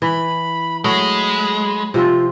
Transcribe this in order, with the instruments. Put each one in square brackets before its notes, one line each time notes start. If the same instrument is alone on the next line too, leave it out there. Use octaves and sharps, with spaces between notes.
[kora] E3 [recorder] B5
[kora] F#3 A3 [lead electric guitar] G#3 [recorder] B5
[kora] C3 F3 C4 [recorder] F4